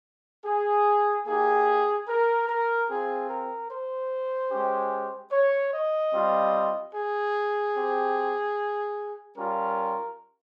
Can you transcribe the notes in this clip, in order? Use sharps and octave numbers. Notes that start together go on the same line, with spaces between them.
G#4
A#3 D#4 G4 G#4
A#4
A#4
C4 F4 G#4
A#4
C5
G#3 C#4 G4
C#5
D#5
G3 C4 F4
G#4
C4 G4
G3 C#4 F4 A#4